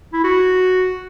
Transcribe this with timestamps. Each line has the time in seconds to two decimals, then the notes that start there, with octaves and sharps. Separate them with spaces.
0.13 E4
0.24 F#4